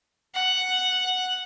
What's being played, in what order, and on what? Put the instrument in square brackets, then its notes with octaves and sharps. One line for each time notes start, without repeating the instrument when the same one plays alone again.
[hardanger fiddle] F#5